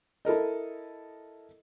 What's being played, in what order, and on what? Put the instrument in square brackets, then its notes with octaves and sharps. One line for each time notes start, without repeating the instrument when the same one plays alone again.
[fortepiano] E4 A4 A#4 D#5